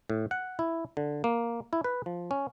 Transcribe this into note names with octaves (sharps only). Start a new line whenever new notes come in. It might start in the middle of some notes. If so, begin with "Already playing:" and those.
A2
F#5
E4
D3
A#3
E4
B4
F3
C#4